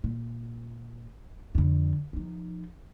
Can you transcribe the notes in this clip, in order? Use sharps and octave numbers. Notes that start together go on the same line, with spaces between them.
A#2
F2 D3
F3 D#4